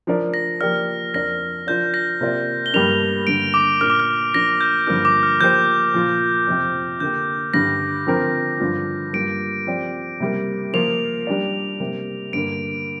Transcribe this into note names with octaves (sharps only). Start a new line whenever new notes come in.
F3 D4 A#4 D5
A#6
F3 A#3 G4 A#4 D5 F6
F2 F3 D4 A#4 D5 A#6
F3 D4 F4 A#4 D5 G6
A#6
C3 A#3 F4 D5
G7
G2 G3 A#3 D4 F7
G2 D3 A#3 D7
D6
A#2 A#3 D4 A#4 F6
D6
F6
F3 A#3 D4 A#6
G6
G2 D3 F3 A#3 D4 F6
D6
F6
F3 A#3 G4 C5 G6
A#2 F3 A#3 F4
F2 C3 F3 C4
D3 A#3 G4 G6
G2 D3 G3 A#6
D3 F3 C4 A#4
G2 D3 F3 D4 F4
G2 G3 A#3 F4 D7
F3 C4 G4 D5
C3 G3 A#3
F3 A#3 F4 F7
G3 D4 G4 A#4 D5
C3 G3 A#3
G2 D3 A#3 D7